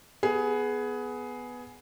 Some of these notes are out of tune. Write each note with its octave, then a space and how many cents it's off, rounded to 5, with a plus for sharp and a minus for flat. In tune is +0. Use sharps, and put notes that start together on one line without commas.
B3 +0 G#4 +15